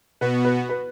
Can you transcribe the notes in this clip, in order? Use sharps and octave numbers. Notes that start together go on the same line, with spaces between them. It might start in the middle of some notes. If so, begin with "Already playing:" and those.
B2 B3 F#4 B4
B4
B4